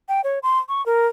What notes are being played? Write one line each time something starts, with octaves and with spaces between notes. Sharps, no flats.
G5
C#5
C6
C#6
A#4